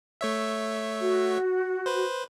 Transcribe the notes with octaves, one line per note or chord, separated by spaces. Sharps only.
A3 C#5 E5
F#4
B4 C5